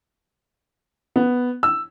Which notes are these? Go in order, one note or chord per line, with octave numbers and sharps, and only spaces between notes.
B3
E6